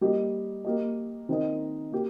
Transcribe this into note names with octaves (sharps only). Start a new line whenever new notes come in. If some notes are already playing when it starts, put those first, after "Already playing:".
G3 A#3 G4 D#5
A#3 G4 D#5
D#3 C4 D#4 A#4 D#5
A#3 G4